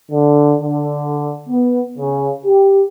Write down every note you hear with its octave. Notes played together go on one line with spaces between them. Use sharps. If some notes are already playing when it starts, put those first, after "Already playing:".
D3
D3
B3
C#3
G4